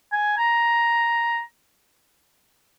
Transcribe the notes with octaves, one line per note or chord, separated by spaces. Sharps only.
G#5
A#5